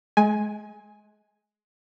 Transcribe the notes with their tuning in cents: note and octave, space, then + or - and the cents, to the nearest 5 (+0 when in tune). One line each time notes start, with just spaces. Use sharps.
G#3 +30 G#5 +0